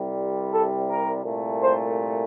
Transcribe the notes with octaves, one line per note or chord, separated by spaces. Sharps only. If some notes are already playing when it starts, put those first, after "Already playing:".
Already playing: C2 C3 G3
A4
A#4
C2 A#2 A3
C5